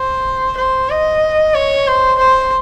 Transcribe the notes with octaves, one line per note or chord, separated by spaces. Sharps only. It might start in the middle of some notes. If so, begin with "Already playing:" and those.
Already playing: C5
C5
D#5
C#5
C5
C5